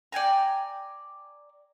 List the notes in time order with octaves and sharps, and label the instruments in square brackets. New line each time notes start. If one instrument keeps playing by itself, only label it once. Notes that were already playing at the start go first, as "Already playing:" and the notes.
[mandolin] D5 G5 G#5 A#5